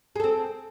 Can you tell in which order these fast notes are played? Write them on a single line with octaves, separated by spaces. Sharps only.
G#4 A4 C4